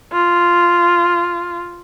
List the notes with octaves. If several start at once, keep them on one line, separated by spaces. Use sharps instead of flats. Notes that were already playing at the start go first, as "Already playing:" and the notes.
F4